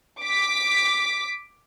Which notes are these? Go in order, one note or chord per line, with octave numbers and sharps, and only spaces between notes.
D6 B6